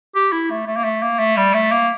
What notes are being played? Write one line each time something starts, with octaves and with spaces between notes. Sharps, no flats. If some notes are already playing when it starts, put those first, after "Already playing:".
G4
E4
A3
A3
A#3
A3
A#3
A3
G3
A3
A#3